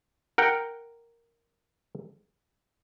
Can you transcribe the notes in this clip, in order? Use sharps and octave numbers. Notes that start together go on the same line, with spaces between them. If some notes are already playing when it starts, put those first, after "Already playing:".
A#4 F#5 G5